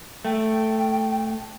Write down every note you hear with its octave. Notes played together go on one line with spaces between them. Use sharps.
A3 G5